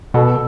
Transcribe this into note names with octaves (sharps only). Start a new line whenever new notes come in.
B2 A4